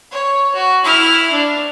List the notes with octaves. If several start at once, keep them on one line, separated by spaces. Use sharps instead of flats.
C#5
F#4
E4 F6
D4